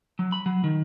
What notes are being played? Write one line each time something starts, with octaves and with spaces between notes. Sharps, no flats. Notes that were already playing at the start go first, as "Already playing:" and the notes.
F#3
B5
F#3
D#3